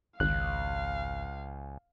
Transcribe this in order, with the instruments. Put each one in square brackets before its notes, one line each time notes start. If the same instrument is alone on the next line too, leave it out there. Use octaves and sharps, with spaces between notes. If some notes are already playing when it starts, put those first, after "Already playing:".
[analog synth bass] G#1 [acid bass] C#2 [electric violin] F5 [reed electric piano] F#6